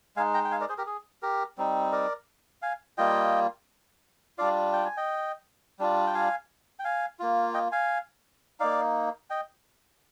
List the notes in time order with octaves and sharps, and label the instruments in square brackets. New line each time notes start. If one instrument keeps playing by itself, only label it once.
[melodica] G#3 D#4 F5 G#5
G5 A#5
G5
F5 G#5
A#4 D5
G#4 C5
G4 A#4
G#4
G4 A#4
G3 C4 D#4
A#4 D5
F5 G#5
G3 A#3 F4 D#5 G5
G3 D4 F4 D5 F5
G5
G#5
D#5 G5
G3 D4 F4
G5
F5 G#5
G5
F5 G#5
A#3 F4
D#5 G5
F5 G#5
A#3 D#4 D5 F5
D#5 G5